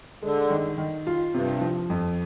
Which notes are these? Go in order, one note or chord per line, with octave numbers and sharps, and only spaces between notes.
D3 G#3
D#3
D#3
F4
G2 C3
F3
F2